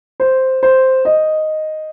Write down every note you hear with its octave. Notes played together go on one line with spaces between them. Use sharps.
C5
C5
D#5